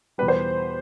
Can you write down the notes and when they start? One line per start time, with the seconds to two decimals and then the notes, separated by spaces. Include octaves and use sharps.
0.18 E2 B2 G3 B4
0.28 C5